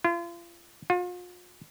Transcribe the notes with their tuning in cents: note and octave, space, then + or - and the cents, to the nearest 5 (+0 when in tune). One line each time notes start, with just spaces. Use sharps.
F4 -35
F4 +40